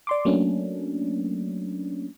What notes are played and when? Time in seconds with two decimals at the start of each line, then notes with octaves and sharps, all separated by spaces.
0.07 D5 C6 D6
0.25 F#3 A3 A#3 C#4 D4